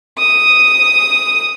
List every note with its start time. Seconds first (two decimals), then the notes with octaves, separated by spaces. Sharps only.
0.18 D#6